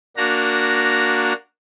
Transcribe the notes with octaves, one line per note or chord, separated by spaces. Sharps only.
A#3 D4 F#4 A#5